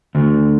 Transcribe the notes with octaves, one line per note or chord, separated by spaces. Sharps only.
D2